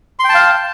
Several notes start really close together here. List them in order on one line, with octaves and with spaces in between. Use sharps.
C6 G5 A5 F5